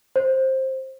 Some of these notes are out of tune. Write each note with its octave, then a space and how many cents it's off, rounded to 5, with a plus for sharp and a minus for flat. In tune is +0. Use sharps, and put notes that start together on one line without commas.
C5 +15